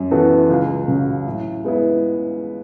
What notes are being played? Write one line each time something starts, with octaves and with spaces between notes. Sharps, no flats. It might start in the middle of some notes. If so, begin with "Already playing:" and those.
Already playing: F#2
E3 B3 F#4 A4
C#2
C#3 F#3
A2
G#3 B3 E4